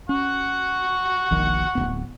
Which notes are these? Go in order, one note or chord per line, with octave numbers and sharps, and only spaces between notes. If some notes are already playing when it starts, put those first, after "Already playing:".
C#4 F#5 C#6
E1 A#1 D#3
D1 F2 B3